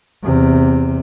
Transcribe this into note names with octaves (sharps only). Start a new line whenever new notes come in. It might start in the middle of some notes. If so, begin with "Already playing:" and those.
E2 C3